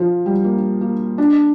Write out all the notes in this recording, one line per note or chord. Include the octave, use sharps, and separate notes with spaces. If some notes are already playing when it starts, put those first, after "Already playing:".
Already playing: F3
G3
A#3
A#3
D4